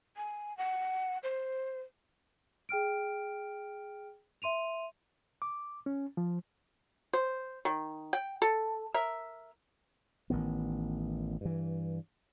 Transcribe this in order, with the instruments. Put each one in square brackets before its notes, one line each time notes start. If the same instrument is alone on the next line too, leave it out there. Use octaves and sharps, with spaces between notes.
[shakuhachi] G#5
F#5
C5
[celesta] G#4 G5 F6 D7
E5 C6 D#7 F7
[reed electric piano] D6
C#4
F3
[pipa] C5
D#3
G5
A4
A#4 E5
[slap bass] A1 D#3 B3
G2 E3